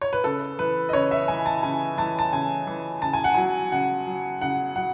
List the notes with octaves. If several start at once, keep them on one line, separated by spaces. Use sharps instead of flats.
C#5
B4
C#3 A4
E3 B4
D#5
C#3 C#5
E5
E3 G#5
A5
C#3 G#5
E3 A5
A5
C#3 G#5
E3
C#3 A5
G#5
F#5
F#3 G#5
C#3 F#5
F#3
C#3 F#5
F#3 F#5